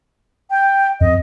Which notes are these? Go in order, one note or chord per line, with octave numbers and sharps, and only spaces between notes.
G5
F2 D#5